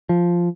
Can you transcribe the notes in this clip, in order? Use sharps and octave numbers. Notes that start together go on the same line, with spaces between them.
F3